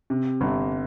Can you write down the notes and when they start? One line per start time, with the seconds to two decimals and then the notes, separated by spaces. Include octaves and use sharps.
0.10 C3
0.41 G1